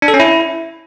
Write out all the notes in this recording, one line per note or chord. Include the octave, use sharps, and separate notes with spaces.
D4
A4
C#4
E4